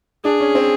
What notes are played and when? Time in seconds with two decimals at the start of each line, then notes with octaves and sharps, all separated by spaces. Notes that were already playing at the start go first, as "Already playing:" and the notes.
0.24 D4 G#4
0.40 C#4
0.55 C4